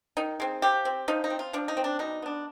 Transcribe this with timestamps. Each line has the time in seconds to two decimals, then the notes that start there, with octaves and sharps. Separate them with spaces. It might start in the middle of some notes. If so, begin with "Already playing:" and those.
0.17 D#3 D#4
0.40 G#3 C4
0.62 F3 G4
0.85 C4
1.08 F3 D#4
1.24 D#4
1.30 C4
1.39 F4
1.53 F3 D4
1.68 D#4
1.77 C4
1.84 D4
1.99 B2 D#4
2.22 B3 D4